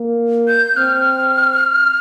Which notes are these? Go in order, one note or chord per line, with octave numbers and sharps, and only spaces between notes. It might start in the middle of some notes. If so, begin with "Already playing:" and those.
Already playing: A#3
G6
C4 F6